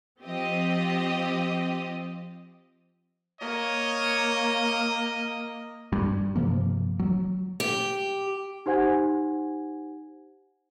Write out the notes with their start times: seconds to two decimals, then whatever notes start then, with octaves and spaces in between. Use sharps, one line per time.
0.21 F3 C4 G4 D#5
3.41 A#3 C#5 D#5
5.92 G2 G3
6.36 G2 C3 F3 A#3
6.99 F#3
7.60 G4
8.66 D#4 G4 C5 F#5 G#5 G#6